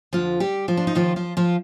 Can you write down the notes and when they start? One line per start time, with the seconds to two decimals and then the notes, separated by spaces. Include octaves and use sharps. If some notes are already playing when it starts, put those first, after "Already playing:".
0.13 F2 D3 F3 F4
0.40 G3 G4
0.68 F3 F4
0.77 D4
0.87 D#4
0.95 D#2 D#3 F3 F4
1.16 F3 F4
1.37 F3 F4